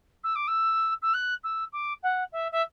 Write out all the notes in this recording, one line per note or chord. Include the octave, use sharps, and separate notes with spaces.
E6
D6
E6
E6
F#6
E6
D6
F#5
E5
E5